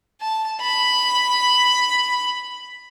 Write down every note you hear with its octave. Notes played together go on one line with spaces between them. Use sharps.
A5
B5